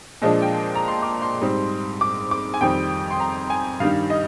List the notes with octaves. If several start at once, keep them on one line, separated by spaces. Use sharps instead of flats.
A#2 F3 G#3 D4 D#5
G5
A#5
C6
D6
C6
G#2 G3 C4
D6
D6
G#5
F2 D#3 G3 C4 G5
C6
A#5
G#5
G2 D#3 G3 F5
D#5